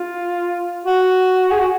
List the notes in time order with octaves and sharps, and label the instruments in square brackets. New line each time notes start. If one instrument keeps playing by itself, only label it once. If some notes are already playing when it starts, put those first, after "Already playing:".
Already playing: [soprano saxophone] F4
F#4
G#4
F#4